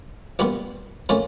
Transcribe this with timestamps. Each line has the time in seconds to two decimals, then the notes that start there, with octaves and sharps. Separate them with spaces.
0.39 A#1 A#2 G3 B3
1.09 A#2 F3 A3 C#4